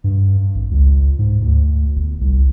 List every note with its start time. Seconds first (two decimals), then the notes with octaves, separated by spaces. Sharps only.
0.04 G2
0.55 G#1
0.71 C#2
1.19 G#2
1.41 D2
1.96 G1
2.21 C2